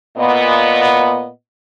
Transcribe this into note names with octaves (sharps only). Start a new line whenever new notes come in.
A#2 B3 D#5